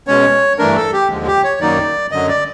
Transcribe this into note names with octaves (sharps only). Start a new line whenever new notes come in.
B2 G#3 C#4 C#5
G2 E3 A3 D4 A#4
A4
G4
D#2 D3 F3 G#3
G4
C#5
F#2 D#3 F#3 A#3 D#4 D5
F#2 D3 F#3 D#5
D5